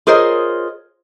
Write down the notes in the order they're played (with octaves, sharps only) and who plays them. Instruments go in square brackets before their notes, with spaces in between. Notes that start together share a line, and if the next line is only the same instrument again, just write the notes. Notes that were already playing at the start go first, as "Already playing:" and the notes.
[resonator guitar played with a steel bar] F4 G#4 A#4 C5 C#5 D#5